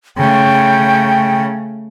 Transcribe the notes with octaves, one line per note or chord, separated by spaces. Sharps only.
C#3 A3 G5